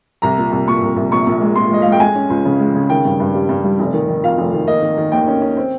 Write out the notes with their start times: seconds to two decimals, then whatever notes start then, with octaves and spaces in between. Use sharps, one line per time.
0.22 C2 A#5
0.38 A#2
0.52 C2
0.68 A#2 C#6
0.82 C2
0.96 C2
1.12 A#1 C#6
1.26 A#1
1.41 G#3
1.56 A#2 C6
1.71 G#3 D#5
1.82 F5
1.86 G#3
1.92 G5
2.00 G#3 G#5
2.15 C#4
2.30 C#2
2.45 C#3
2.60 G#3
2.75 C#3
2.90 D#3 G5
3.05 G2
3.20 G2
3.34 G3
3.49 G2
3.64 G3
3.79 F1
3.94 D#3
4.09 D#3
4.23 F2 F5
4.38 F1
4.53 D#3
4.67 A#3 D#5
4.82 D#3
4.98 D#3
5.12 D#2 G5
5.28 C#4
5.41 C#4
5.57 C4